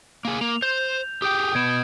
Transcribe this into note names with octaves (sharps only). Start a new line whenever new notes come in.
A#3 G#4
A#3 F7
C5 G6
G4 G#4 G5 D#6 G6
B2 B3 G#6 D7 E7